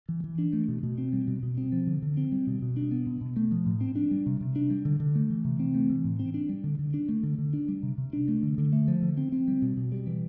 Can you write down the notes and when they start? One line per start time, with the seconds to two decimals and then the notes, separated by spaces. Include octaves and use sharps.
0.09 E3
0.24 E3
0.38 D4
0.53 A3
0.68 B2
0.83 B2
0.98 C4
1.13 G3
1.27 B2
1.43 B2
1.57 C4
1.72 F3
1.87 D3
2.02 D3
2.17 C4
2.32 G3
2.47 B2
2.62 B2
2.77 D4
2.91 B3
3.07 B2
3.21 B2
3.36 A3
3.51 F3
3.66 A2
3.81 C4
3.96 D4
4.11 G3
4.26 C3
4.41 C3
4.56 D4
4.70 G3
4.85 D3
5.00 D3
5.16 A3
5.30 E3
5.45 C3
5.60 C4
5.75 A3
5.90 E3
6.05 A2
6.19 C4
6.34 D4
6.49 G3
6.64 D3
6.79 D3
6.94 D4
7.09 A3
7.23 D3
7.38 D3
7.53 D4
7.68 G3
7.83 C3
7.98 C3
8.13 D4
8.28 A3
8.43 D3
8.58 D3
8.73 A3
8.88 F3
9.02 D3
9.17 C4
9.32 C4
9.48 G3
9.62 B2
9.77 B2
9.92 G3
10.07 E3